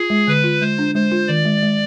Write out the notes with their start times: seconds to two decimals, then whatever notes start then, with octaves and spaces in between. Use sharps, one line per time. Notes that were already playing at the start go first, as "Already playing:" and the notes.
Already playing: F4 G#4
0.10 G#3
0.27 D3 B4
0.44 F4
0.61 G#3 C5
0.79 D4
0.95 G#3 C5
1.12 F4
1.28 D#3 D5
1.45 G#3
1.62 G#3